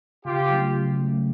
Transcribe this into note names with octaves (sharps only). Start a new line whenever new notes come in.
C#3 F4 G4
F#3 A3 C#4
C#3
F#3 A3 C#4